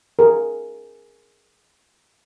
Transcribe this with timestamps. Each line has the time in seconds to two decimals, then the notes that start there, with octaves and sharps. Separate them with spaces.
0.19 G#4 A#4